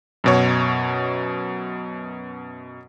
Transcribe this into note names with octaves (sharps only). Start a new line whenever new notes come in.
F#2 B2 C#5